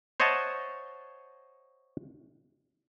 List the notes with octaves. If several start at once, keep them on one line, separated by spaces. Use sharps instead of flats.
C5 C#5 D#5 E5 F#5 A5